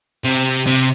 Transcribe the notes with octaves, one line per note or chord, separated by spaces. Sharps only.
C3
C3